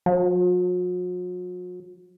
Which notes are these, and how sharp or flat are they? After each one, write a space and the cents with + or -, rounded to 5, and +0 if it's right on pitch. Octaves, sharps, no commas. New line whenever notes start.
F#3 -45